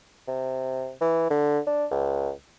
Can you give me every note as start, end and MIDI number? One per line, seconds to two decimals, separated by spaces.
0.28 0.91 48
1.01 1.30 52
1.30 1.59 50
1.67 1.85 62
1.91 2.31 37